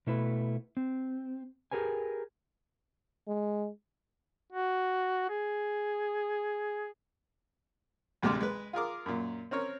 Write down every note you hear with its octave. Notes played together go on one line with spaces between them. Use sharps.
B2 A3 E4 B4
C4
G4 G#4 A#4 B4 G#5
G#3
F#4
G#4
A1 D2 C3 G#3 D6 F6
G#3 B4
F4 G#4 A#4 D6
F#2 A#2
C4 C#4 A#4 C#5